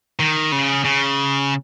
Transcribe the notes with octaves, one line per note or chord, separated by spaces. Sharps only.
D#3
C#3
C#3